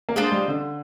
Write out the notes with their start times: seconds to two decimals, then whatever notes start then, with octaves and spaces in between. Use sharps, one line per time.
0.09 A#3
0.16 G#3 D4 F4 C5 D#5
0.32 G3
0.48 D3